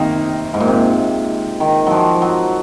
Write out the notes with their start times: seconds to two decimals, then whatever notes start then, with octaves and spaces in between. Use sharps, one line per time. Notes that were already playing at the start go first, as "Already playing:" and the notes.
Already playing: C3 D#3 A#3 D#4
0.54 G#2
0.60 A#2
0.68 C3
1.60 D#3
1.87 F3 F#3
2.22 F#3